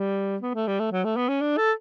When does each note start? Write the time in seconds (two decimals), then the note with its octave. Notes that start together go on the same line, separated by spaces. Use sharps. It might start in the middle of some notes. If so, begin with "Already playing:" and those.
Already playing: G3
0.42 B3
0.55 A3
0.67 G3
0.80 A3
0.92 F#3
1.04 A3
1.16 B3
1.29 C#4
1.41 D4
1.57 A4